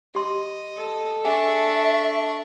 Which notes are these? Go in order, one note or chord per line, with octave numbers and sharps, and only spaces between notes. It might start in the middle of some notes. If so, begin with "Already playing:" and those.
G4 D#5 C6
A4
D4 G#4 E5 G#5 C#6